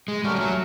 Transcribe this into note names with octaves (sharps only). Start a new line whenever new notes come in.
G#3
G3 A3 C#4 F#4 A#4
G3
F#3